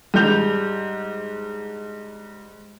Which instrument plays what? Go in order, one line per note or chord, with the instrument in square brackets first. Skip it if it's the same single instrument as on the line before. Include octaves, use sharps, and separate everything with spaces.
[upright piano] G#2 G3 D4 G6 F7